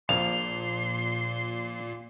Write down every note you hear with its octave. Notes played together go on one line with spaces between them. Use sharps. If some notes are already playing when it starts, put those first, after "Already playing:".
A#1 A#2 F5 C6 F7